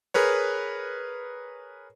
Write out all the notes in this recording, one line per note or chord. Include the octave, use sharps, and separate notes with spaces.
G#4 A#4 B4 C#5